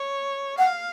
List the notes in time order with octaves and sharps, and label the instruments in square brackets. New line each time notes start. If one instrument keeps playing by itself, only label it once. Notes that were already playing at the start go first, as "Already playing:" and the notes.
Already playing: [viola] C#5
[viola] F5 [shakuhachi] F#5